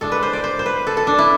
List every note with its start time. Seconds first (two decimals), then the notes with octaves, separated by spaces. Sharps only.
0.01 A2 G#3 D4 A4
0.12 B4
0.23 C5
0.33 D5
0.44 C5
0.59 C5
0.66 B4
0.87 A4
0.97 A4
1.07 D4
1.18 E4